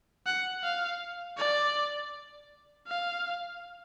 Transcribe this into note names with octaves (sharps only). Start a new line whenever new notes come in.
F#5
F5
D5
F5